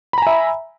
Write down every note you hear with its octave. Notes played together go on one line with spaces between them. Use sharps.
E5 G#5 A#5 B5